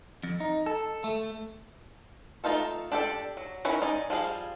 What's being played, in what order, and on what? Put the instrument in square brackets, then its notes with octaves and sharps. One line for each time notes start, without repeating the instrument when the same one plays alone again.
[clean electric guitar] F2
D#4
A4
A3
[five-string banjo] A3 B3 D#4 F4 A4
D4 G4 A4 D5
F#3
D#3 C#4 E4 B4 C#5
D#4 D5 G#5
F3 G3 G#4 F5